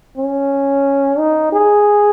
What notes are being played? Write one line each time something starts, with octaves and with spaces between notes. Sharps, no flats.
C#4
D#4
G#4